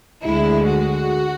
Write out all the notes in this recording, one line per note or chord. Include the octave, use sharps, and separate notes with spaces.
D2 D3 G#3 E4
F#4